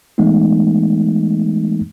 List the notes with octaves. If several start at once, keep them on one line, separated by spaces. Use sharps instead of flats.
E3 G#3 A3 B3 D#4